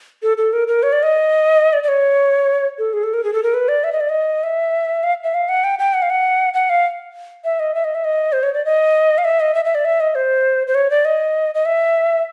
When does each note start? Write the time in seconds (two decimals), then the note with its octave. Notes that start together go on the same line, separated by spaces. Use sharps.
0.23 A4
0.38 A4
0.53 A#4
0.68 A#4
0.83 C#5
0.92 D5
1.03 D#5
1.73 D5
1.83 D5
1.88 C#5
2.79 A4
2.93 G#4
3.03 A4
3.14 A#4
3.24 G#4
3.33 A4
3.43 A#4
3.54 B4
3.68 D5
3.84 E5
3.92 D#5
4.00 D5
4.09 D#5
4.44 E5
5.03 F5
5.24 E5
5.34 F5
5.49 F#5
5.64 G5
5.79 G5
5.94 F#5
6.02 F5
6.10 F#5
6.54 F#5
6.70 F5
7.44 E5
7.60 D#5
7.75 E5
7.84 D#5
7.95 E5
8.04 D#5
8.33 C5
8.43 C#5
8.54 D5
8.65 D#5
9.18 F5
9.25 E5
9.40 D#5
9.55 E5
9.65 E5
9.75 D5
9.85 E5
10.00 D#5
10.15 C5
10.67 C5
10.75 C#5
10.90 D5
11.05 D#5
11.55 D#5
11.65 E5